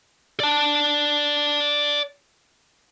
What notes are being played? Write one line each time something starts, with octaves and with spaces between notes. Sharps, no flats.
D5 A5